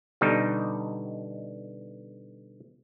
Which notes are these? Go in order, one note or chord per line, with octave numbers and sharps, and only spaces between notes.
B2 D3 G3 D#4